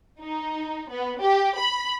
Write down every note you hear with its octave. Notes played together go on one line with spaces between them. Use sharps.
D#4
B3
G4
B5